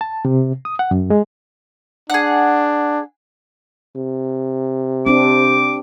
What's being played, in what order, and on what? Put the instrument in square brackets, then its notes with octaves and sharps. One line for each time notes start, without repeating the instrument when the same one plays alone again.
[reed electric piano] A5
C3
D#6
F#5
F#2
G#3
[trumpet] D4 [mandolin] G#4 F#5
[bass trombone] C3
[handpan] C4 D4 G4 [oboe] D6